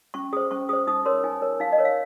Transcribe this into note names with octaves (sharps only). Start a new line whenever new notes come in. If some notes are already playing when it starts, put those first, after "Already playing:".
C#4 C#6
G#4 C5 D#6
C#4 C#6
G#4 C5 D#6
D#4 D#6
A#4 C#5 C6
D#4 G#5
A#4 C#5
D#4 F5
D#5
A#4 C#5
F5